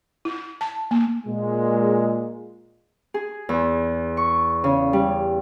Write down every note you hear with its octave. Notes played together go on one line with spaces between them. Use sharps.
E4
A5
A#3
A#2 G#3
G#4
E2
C#6
C#3
G3